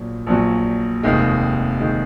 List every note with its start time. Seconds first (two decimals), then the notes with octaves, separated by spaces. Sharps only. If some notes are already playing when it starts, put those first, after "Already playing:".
Already playing: A#1 A#2 F#3
0.26 A#1 A#2 F#3
1.03 F1 D#2 D#3 G#3
1.81 D#3 G#3